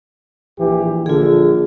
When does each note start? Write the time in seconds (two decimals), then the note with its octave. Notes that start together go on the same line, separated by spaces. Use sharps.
0.58 A#1 E3 G4
1.06 A#1 A#2 D3 F4 G#4